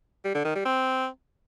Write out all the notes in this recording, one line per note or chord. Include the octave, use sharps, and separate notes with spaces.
G3
D3
D#3
G3
C4